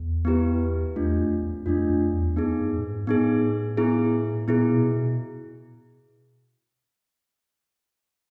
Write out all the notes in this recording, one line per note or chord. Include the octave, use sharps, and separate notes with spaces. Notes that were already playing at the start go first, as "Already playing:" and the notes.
Already playing: E2
B3 E4 G4 B4
E2 A3 D4 F4
F2
F2
F2 A3 D4 F4
F2
E2
F2 B3 D#4 G#4
G2
A2
G#2
A2 B3 D#4 G#4
B3 E4 G#4
A#2 B3 E4 G#4
B2
B2